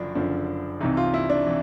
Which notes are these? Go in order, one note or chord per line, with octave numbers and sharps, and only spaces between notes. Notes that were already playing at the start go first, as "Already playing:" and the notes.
Already playing: F#1 F#2 D3 F3 D4
F#1 F#2 D3 F3
C2 C3 E3 D#4
F4
E4
D4
C3 E3